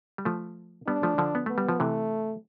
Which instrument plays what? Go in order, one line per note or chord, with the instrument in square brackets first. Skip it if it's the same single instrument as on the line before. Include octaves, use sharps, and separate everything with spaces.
[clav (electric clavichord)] G3
F3 A3
[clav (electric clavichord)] G3 B3 [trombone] D4
[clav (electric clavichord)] F3 A3
D3 F3
B3
[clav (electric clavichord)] A3 [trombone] B3
[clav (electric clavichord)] G3
F3
[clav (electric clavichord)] C3 E3 [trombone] A3